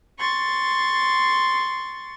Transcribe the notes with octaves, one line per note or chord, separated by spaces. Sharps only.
C6 C#6 A6